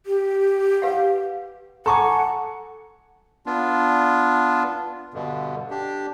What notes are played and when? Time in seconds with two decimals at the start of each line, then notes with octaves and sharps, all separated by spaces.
0.06 G4
0.82 B4 F5 F#5
1.86 A4 F#5 G#5 A#5 C#6 D6
3.46 B3 D4 F4
5.14 G2 B2 D3
5.70 D4 G4